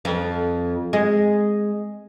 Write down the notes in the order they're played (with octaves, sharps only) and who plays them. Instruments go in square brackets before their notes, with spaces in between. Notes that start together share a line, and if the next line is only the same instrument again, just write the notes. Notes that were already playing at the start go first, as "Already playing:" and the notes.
[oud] F2
G#3